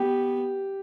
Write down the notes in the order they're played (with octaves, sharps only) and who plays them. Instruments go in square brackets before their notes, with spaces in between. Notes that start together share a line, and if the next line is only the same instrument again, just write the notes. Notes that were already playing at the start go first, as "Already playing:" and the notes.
Already playing: [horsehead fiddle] B3 [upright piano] G4